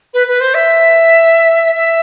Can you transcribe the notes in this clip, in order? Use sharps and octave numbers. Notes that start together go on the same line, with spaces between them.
B4
B4
C5
E5
E5